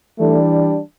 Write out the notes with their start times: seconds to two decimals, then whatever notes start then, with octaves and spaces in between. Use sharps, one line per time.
0.18 E3 G3 A3 D4 A4